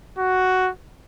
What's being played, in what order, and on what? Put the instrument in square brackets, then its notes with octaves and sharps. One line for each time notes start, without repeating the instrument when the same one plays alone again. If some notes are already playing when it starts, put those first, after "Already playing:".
[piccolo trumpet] F#4